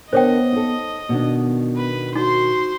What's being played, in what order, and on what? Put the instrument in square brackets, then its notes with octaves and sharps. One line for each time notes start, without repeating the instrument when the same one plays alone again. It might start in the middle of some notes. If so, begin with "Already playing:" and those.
[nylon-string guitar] D3 A#4 [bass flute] B3 [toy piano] C5 C#5 G5 [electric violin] D#5
[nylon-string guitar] D#4 A4
[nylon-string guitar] B2 D#3 D4 [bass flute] B3
[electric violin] B4
[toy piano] D#4 [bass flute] F#4 [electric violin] C5 C6